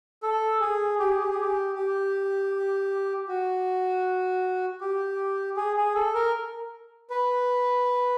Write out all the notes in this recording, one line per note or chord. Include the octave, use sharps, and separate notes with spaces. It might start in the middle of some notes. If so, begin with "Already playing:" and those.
A4
G#4
G4
G#4
G4
G#4
G4
G4
F#4
G4
G#4
G#4
A4
A#4
B4